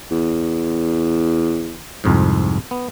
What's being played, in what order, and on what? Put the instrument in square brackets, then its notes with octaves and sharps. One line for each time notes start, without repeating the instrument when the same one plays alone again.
[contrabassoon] E2
[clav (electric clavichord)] C2 F2 G#2
B3